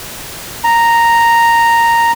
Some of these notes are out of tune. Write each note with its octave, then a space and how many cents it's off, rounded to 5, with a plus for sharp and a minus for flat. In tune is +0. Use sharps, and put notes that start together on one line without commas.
A#5 -5